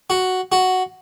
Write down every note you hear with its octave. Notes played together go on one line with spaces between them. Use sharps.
F#4
F#4